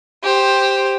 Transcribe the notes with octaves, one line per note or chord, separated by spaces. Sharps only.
G4 C5